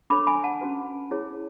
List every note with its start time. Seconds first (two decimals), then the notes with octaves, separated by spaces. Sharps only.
0.10 D4 A4 C#5 B5 D6
0.27 G#5 B5
0.44 F#5 A5
0.61 C#4 F#4 B4
1.11 E4 G#4 C#5